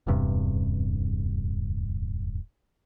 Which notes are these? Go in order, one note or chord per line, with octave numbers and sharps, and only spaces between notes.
D1 E2 G2 C3